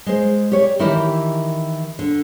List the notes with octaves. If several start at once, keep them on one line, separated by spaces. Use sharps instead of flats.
G#3 C5
G4 C#5 D5
D#3 E3 E4 G4 A#4
D3